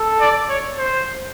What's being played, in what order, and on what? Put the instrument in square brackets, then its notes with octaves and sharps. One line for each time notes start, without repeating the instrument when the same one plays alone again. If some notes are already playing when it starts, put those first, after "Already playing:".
Already playing: [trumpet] A4
[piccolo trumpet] D5
C#5
C5